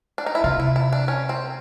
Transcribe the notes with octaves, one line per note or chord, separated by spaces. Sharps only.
D4
D#4
E4
C3 F4
E4
E4
D4
C#4
C4